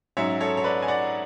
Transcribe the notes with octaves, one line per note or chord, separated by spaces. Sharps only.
G#2 F#3 C#4 C#5 E5
A4 C#5
C#5
B4 D5
G#5
D5 F#5